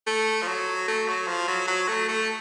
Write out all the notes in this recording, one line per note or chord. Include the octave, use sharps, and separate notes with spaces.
A3
F3
F#3
A3
F#3
F3
F#3
F#3
A3
A3